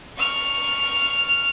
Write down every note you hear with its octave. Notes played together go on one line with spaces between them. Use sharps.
C#6 F6